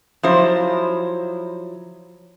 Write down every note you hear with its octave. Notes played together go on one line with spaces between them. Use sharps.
F3 F#3 E4 C5